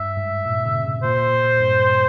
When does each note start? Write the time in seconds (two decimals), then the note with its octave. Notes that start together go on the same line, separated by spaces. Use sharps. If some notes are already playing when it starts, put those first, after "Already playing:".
Already playing: G2 E5
0.17 G#2
0.46 A#2
0.66 C#3
0.85 C3
1.03 A#2 C5
1.61 G2